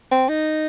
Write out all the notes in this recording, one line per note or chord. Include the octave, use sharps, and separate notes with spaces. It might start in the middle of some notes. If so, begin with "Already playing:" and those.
C4
D#4